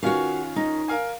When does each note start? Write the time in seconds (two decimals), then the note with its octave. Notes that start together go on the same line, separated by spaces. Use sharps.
0.03 D#3 C#4 F4 F#4 F5
0.56 D#4
0.88 A#4 F5 G#5